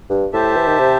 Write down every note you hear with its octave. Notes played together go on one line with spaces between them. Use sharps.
G2
A2 G4 C5 E5 A5
E3
D#3
C3